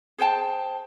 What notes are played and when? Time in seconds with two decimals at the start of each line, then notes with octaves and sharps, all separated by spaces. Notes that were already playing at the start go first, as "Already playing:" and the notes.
0.18 G#4 C5 G5 A5